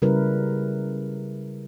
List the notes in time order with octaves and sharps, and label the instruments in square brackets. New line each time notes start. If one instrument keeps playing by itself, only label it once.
[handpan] C#3 G3 E4 A#4 B4